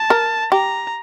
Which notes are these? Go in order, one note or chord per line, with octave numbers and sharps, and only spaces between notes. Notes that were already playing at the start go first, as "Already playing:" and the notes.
Already playing: A5
A#4
G4 A#5